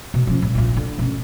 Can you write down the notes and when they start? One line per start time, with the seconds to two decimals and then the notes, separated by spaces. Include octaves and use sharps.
0.14 B2
0.27 F3 C#4
0.42 A#2 G3
0.55 A#1 A#2
0.77 D3
0.99 B2 C#4